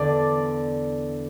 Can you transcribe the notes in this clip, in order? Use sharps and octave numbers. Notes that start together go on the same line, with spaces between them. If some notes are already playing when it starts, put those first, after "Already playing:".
Already playing: E2 D3 D5